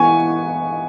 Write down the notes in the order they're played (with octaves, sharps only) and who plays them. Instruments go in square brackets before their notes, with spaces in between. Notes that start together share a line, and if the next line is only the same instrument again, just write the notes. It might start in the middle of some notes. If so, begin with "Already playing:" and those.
Already playing: [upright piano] E3 B3 G#5 C#6